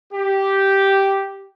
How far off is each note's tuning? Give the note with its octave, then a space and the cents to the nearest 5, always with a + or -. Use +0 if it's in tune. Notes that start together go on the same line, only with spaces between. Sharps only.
G4 -5